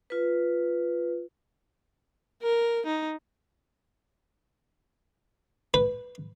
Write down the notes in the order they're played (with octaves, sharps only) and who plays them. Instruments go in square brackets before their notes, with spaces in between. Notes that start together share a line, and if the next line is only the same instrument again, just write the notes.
[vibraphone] F4 B4
[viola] A#4
D#4
[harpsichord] B4